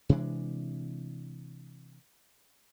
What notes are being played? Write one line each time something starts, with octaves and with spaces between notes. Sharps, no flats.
C3 E3 G#3 D4